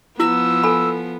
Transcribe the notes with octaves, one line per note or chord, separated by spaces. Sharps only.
F3 B3 E4 E6
A4 G#5 B5